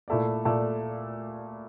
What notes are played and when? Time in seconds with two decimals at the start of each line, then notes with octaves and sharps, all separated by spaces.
0.08 A#2 A3 E4 A4 D5
0.45 A#2 A3 E4 A4 D5